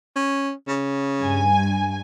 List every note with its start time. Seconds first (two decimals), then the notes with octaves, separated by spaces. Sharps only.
0.16 C#4
0.68 C#3
1.22 G2 G#5